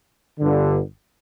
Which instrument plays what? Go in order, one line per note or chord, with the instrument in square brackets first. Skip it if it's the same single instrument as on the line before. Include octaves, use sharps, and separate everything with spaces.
[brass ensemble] G1 G2 D3